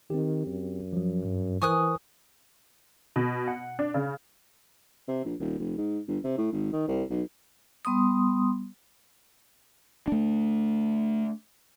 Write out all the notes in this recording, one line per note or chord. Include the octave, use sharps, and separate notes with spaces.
D#3 C4 G4
F#2
F3 F#3
G2
E3 A#4 C5 G#5 C#6 D#6 F#6
B2
F#5
D4
C#3
C3
A#1
D#1
F1
G#2
G1
C3
A2
G#1
D#3
C2
B1
G3 B3 C6 D#6
A3 D4